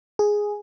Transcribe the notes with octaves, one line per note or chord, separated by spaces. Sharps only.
G#4